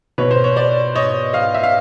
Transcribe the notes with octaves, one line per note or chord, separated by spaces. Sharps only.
B2 B4 C#5
C5
C#5
C5 D5
C#5 D#5
D#5 F5
E5
F5